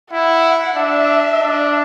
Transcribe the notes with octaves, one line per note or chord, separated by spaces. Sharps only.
E4 F#5
D4 E5
D4